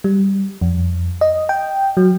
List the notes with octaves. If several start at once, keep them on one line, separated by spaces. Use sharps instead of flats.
G3
F2
D#5
G5
F#3